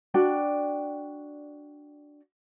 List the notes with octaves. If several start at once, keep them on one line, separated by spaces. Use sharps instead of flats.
D4 F#4 D5 G5